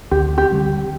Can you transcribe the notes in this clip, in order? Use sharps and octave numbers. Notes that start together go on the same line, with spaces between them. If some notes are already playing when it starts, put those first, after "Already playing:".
D2 G4
G4
D3 G3 C4